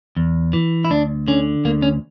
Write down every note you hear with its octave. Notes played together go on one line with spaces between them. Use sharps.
E2
E3
E4
D2 D4
D3 C#4
D2 A#3
C#4